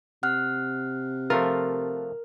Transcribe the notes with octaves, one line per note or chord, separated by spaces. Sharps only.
C3 F#5 F6 F#6
F3 A3 F4 A#4